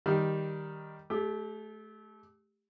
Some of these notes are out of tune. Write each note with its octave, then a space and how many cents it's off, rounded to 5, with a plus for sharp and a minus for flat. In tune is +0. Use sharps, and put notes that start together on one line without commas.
D#3 +0 G3 +0
A3 -30 G4 +15